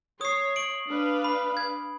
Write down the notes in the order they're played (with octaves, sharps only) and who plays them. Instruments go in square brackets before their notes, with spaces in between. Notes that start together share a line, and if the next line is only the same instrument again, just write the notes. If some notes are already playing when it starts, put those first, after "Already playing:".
[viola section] C#5 [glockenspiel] D#6 C7
[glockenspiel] D7 F#7
[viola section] D4 B4 F5
[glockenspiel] B5
G#6